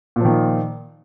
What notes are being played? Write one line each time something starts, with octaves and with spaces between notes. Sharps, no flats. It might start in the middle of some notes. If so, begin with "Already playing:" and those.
A#2 D#3 F3